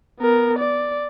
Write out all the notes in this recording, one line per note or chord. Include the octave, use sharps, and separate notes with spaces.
B3 A#4
D5